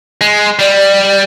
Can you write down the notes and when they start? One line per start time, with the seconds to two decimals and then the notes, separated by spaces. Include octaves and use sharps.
0.21 G#3
0.59 G3 D5